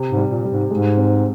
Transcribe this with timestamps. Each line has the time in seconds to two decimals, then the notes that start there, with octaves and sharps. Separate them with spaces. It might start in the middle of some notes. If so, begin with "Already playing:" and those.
Already playing: C3
0.11 G#2
0.17 G3
0.30 A#2
0.45 G3
0.51 G#2
0.71 G#2 G#3
0.97 C4